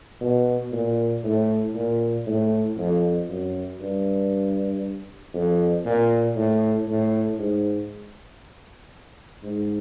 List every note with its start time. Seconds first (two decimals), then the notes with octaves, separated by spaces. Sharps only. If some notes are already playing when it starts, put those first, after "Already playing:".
0.21 B2
0.72 A#2
1.24 A2
1.75 A#2
2.26 A2
2.77 F2
3.29 F#2
3.80 G2
5.34 F2
5.85 A#2
6.36 A2
6.87 A2
7.39 G#2
9.43 G#2